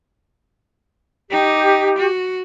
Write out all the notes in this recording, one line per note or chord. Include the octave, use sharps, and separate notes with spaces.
D#4 G4
F#4